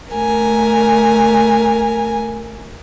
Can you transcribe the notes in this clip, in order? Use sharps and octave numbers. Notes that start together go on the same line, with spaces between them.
A3 A#4 G#5